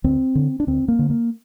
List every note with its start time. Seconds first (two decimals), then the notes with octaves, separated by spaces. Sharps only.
0.04 D2 C4
0.35 D3
0.60 D4
0.67 D2 C4
0.88 A#3
0.99 D3
1.10 A#3